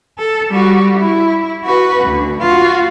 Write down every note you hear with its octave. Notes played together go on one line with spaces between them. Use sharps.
A4
G3 F#4
E4
F#4 B4
D2
F4 F#4